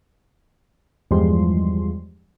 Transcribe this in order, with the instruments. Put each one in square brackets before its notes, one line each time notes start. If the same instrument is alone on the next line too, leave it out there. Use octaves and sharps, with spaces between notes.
[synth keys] E2 G2 F3 G3 G#3 C6